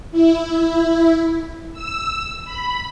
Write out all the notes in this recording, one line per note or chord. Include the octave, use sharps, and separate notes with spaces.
E4
E6
B5